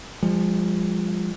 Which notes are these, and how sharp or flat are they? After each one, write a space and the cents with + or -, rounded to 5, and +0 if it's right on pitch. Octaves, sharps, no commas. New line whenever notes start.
F3 +0 G#3 -45